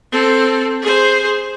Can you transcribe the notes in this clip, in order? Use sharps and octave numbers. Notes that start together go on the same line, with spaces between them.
C4 A4
G#4 C5